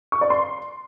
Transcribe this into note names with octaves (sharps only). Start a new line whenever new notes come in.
C#6
D5
C6